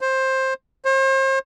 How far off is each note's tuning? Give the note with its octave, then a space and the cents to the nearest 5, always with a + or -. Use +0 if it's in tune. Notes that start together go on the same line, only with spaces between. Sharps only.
C5 +15
C5 +40